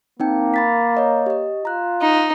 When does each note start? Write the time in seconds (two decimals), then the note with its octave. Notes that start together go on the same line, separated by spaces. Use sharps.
0.20 A#3 C4 D#4 G5
0.54 B5 A6 B6
0.95 C#5 D#5 A#5
1.26 G4 D#5
1.65 F4 A#5 F#6
2.01 D#4